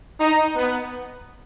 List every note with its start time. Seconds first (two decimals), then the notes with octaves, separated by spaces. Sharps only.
0.20 D#4
0.56 B3